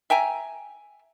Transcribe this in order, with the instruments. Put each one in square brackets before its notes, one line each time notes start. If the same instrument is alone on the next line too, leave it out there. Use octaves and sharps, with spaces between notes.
[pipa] E5 G5 G#5 A#5